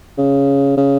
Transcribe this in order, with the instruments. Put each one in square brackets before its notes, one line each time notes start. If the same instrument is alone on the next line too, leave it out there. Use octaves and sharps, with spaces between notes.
[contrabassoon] C#3
C#3